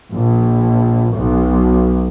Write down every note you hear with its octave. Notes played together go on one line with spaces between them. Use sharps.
A#1
B1